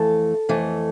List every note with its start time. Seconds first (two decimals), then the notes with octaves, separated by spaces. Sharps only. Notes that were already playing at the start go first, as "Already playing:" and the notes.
Already playing: F2 E3 A3 A4
0.49 F2 E3 A3